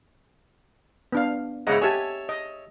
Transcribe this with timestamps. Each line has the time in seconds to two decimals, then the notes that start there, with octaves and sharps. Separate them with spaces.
1.12 B3 D4 F5
1.67 G#2 C#3 E4 D#5 F#5 A#5
1.82 G4 A4 C#5 E5 G#5 A5
2.29 D#5